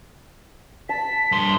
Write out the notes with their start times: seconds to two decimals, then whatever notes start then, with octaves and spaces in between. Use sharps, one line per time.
0.89 A5 B6
1.32 G2 C6